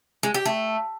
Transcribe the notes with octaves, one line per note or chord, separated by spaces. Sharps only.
G#3
G4
A3